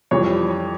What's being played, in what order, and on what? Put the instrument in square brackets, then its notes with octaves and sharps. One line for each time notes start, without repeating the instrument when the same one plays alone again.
[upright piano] F2 E3 G3 C#5